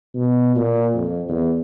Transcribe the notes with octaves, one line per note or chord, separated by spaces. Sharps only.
B2
A#2
F2
E2